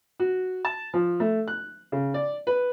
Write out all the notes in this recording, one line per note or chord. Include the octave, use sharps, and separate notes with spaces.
F#4
A5
F3
A3
F#6
C#3
D5
B4